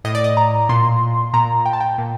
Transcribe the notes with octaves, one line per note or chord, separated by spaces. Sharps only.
A2 D#5
D5
D#5
A#5
A#2 C6
A#2 A#5
G5
A5
G5
A#2